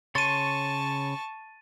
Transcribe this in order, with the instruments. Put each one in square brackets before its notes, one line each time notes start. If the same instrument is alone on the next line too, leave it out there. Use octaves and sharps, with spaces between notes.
[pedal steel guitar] C#3 C#5 C6 [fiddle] A5 C#6 [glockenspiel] A6 D#7